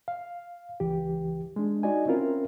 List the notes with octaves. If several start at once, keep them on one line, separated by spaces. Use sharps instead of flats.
F5
C#2 E3 G4
G#3 D4
D#4 F#4 D5 D#5 G#5
C4 C#4 E4 F4 A#4